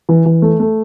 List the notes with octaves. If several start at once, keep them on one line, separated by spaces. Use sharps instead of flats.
E3
E3
A3
A3